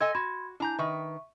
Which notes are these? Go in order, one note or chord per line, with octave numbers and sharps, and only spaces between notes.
A4 D#5 G#5 C6 G#6
F#4 B5 C6 G#6
D4 E4 G#5 A#5 G6
D#3 B4 E5 C#6